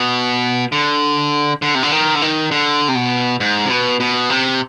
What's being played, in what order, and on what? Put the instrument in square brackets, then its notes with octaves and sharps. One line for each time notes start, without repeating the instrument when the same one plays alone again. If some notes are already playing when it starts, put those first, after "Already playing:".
Already playing: [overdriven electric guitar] B2
D3
D3
C3
D3
D#3
D3
D#3
D3
C3
B2
G#2
C3
B2
B2
C3